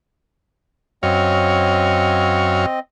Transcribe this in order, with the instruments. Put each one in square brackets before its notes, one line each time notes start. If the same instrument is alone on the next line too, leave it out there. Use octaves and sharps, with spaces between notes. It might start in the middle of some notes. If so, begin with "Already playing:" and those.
[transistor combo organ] F#2 C#5 F5 [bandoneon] C4 D#5